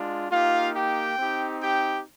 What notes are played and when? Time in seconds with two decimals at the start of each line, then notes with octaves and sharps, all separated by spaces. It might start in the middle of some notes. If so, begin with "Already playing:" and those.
Already playing: G#3 D4 F4
0.31 A#3 D#4 F4 G4 F5
0.74 G4 G5
1.18 C4 D#4 G4
1.61 G4 G5